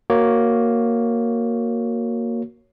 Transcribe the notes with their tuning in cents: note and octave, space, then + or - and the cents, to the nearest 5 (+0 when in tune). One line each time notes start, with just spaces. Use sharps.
A#3 +0 F#4 +5 C#5 +0